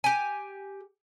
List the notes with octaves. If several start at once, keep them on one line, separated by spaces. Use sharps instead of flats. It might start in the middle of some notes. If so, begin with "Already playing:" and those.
G4 G#5